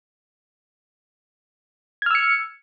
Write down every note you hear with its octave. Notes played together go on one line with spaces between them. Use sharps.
E6 F6 G#6 C#7